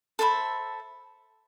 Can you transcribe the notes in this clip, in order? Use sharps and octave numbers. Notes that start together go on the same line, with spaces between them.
A4 C5 E5 B5